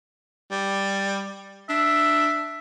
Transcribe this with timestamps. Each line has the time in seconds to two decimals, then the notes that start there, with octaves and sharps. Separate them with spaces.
0.51 G3
1.69 D4 E5